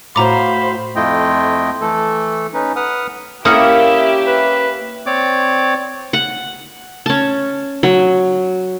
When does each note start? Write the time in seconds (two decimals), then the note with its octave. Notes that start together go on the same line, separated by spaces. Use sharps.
0.16 A2 F#4 C5 F5 A#5 B5 D6
0.95 F2 A3 E4 F4 D#5 G5
1.81 E3 A3 A4
2.54 C#4 D#4 B4
2.76 B4 F#5 D#6 F6
3.45 A#3 C#4 E4 G4 E5 F#5 D6 D#6
4.26 B4
5.06 C4 C#5 D5 D6
6.13 F#5
7.06 C#4 A5
7.83 F#3